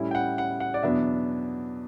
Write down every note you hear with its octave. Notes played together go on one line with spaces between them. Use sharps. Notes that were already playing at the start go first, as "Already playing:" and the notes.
Already playing: A2 G3 C#4 E4
G5
F#5
F#5
F#5
D5
E2 B2 F#3 B3 D4 E5